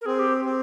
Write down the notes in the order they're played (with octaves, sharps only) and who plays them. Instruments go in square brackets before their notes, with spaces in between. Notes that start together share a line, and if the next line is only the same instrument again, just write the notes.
[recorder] A#4
[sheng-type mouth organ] C4 [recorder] G#4
[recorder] G4
[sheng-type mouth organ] C4